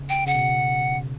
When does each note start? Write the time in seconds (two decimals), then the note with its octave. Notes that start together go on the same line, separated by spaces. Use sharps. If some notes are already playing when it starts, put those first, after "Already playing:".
Already playing: C#3
0.09 G5
0.27 C#3 F#5
0.35 B2